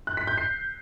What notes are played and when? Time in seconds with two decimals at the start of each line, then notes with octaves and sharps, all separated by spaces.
0.07 F#6
0.17 B6
0.27 G6
0.38 C7